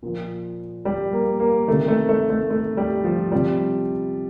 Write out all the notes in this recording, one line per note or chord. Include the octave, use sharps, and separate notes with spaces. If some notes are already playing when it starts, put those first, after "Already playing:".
A#2 F3
G3
A#3
A#3
C3 D#3 A3
A3
A3
A3
A3
G3
F3
C3 F3 G3